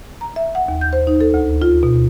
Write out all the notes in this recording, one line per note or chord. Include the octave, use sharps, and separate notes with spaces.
A#5
E5
F#5
D#2
G6
C5
D#4
A4
D2
F4
B2